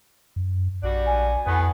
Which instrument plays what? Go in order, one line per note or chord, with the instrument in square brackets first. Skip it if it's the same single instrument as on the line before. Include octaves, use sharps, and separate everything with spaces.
[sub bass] F#2
[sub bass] A#1 [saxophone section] G3 D4 F#4
[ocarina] G#5
[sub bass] F2 [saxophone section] A2 B3